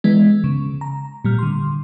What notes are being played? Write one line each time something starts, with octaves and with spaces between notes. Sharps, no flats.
E3 G#3 B3
C#3
A#5
A#2 G3 F6
D3 C6